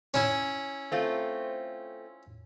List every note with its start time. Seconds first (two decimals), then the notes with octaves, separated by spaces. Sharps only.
0.14 C#4 E4
0.92 A3 C4 F4